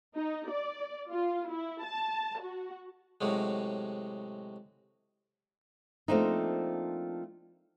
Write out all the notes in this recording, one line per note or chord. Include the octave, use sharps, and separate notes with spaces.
D#4
D5
F4
E4
A5
F#4
A2 C3 F#3 G#3
F3 A3 A#3 C4 D4 D#4